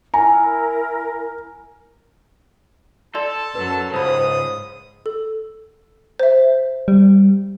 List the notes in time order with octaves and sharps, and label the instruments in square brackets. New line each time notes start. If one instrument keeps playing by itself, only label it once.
[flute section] E4 A#4 [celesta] G#5 [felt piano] A#5
[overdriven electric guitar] A4 [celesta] D5 C6 [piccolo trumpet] A5
[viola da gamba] F#2 F#3 [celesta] B4
[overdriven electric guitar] C#2 [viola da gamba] G#2 [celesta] C5 B5 [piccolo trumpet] D#6
[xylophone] A4
C5 E5
[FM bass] G3